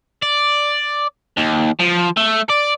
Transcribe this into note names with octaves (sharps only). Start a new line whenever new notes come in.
D5
D#2
F3
A3
D5